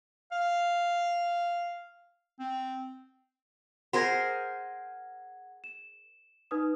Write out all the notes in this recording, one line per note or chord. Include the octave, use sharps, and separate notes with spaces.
F5
C4
G#4 A#4 C5 F#5 G#6
E7
D#4 B4 D#6